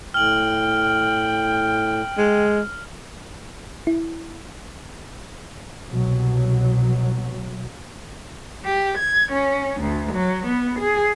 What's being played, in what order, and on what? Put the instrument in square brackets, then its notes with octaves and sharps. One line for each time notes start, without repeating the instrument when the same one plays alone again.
[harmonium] A2 [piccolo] G5 [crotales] F6 F#7
[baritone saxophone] G#3
[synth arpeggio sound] E4
[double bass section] C2 B2 F#3
[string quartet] G4
G#6
C#4
D2
F#3
B3
G#4